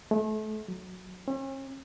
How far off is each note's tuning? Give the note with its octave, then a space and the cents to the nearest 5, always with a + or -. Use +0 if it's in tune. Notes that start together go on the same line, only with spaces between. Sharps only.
A3 -35
F#3 -10
C#4 -45